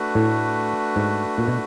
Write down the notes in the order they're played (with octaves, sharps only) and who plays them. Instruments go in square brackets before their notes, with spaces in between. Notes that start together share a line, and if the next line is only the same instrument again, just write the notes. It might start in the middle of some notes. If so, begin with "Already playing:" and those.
Already playing: [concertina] A3 D4 F#4 B4
[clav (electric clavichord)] A2
G#2
A#2
B2